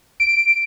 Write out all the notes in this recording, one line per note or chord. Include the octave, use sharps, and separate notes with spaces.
D7